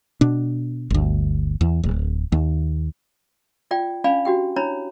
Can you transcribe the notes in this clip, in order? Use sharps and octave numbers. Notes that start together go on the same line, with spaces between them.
B2 D4
G1 D2
E2
D1
D#2
F4 D5 G5
C#4 D4 D5 F5 G#5 B5
D4 F#4 G4 G5
D4 E4 C#5 A#5 B5